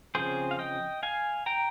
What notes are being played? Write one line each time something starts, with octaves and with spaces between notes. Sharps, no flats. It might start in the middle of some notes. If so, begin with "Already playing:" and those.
C#3 F3 C4 G#4 C5
F5
D#5 G5
F5 G#5
G5 A#5